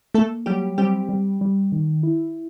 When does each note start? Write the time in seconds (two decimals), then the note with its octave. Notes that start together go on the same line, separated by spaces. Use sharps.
0.14 A3 A#3 A4
0.46 F#3 G3 G4
0.78 G3 C4 G4
1.09 G3
1.41 G3
1.72 D#3
2.03 E4